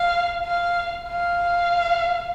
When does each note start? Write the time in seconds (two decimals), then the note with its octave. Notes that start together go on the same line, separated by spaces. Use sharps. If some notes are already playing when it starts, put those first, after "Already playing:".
Already playing: F5
0.46 F5
1.09 F5